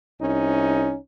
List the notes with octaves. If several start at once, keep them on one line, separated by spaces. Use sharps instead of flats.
C2 C#4 D#4